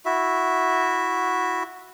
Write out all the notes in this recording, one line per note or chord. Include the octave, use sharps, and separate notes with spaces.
E4 F#4 E5